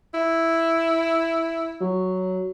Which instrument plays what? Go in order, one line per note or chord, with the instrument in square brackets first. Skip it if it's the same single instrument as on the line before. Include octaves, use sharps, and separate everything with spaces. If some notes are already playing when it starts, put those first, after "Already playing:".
[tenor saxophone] E4
[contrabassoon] F#3